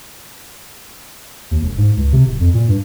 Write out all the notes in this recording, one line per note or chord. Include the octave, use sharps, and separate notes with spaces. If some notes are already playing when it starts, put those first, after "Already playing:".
D#2
E1
G#2
C#2
C3
D1
F2
A#2
G2